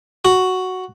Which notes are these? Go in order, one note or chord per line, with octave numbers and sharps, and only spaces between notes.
F#4